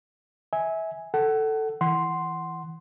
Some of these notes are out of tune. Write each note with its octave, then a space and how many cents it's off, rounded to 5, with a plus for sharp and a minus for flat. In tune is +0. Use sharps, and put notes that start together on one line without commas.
E5 -25 G#5 +0
A4 +5 F#5 +30
E3 +0 F#5 +10 C6 +0